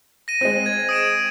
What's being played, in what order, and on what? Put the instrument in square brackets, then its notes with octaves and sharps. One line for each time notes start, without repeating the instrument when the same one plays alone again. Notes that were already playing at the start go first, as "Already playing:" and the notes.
[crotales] A#6 D#7
[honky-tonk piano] G#3 C4
[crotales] G#6
D#6 D7 E7